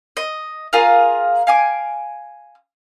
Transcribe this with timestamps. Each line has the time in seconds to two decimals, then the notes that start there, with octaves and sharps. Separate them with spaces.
0.17 D#5
0.73 F4 G#4 A#4 F5
1.47 F5 G#5 D6